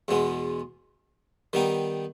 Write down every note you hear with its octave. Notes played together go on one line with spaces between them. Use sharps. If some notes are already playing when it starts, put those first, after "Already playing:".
E2 B2 G#3 B3
D#3 G3 B3 D#4